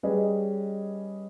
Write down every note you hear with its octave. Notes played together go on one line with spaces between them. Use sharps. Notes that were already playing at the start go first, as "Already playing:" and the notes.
G3 C#4 G#4 B4 D#5